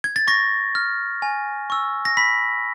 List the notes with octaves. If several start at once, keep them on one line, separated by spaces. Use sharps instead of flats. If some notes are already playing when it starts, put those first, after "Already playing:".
G#6
A6
C#6 A#6
F6
G#5
C#6 E6
A#6
B5 B6